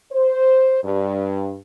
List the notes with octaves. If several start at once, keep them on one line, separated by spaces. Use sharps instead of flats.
C5
G2